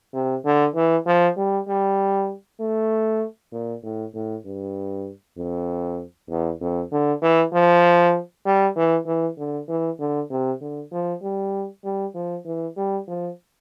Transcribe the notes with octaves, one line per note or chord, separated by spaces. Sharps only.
C3
D3
E3
F3
G3
G3
A3
A#2
A2
A2
G2
F2
E2
F2
D3
E3
F3
G3
E3
E3
D3
E3
D3
C3
D3
F3
G3
G3
F3
E3
G3
F3